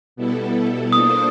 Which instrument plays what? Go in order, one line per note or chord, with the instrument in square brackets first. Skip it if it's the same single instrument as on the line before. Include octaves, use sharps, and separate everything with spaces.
[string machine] B2 G3 B3 E4 A4
[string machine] A#3 D4 F4 A4 C5 [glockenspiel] D#6